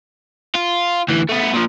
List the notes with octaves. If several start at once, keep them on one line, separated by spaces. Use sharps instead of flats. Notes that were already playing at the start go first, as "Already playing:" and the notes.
F4
D2 E3
A3 B3
A#2 F3